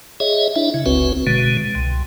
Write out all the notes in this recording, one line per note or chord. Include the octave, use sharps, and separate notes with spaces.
G#4 C#5 D#5 E5
D4 E4 E5
C#3
F#1 C#2 C4 F#4 B4
B2 D3 G#3
C2